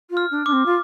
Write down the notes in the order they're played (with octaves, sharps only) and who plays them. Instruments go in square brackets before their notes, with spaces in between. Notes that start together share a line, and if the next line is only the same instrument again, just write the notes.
[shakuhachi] F4
[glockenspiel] F6
[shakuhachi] D4
[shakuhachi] D4 [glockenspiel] D6
[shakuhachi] C4
F4